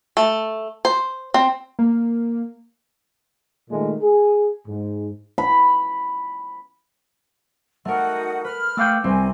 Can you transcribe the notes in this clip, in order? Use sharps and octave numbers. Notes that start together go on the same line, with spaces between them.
A3
C5
C4
A#3
A#2 D#3 G#3 A3
G#4
G#2
B5
A3 D#4 F#4 A#4 F#5
B4 F6
A3 F5 G5 D6 E6
C2 C4 G#5